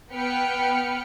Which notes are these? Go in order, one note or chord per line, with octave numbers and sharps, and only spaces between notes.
B3 B4 G5 F6 C#7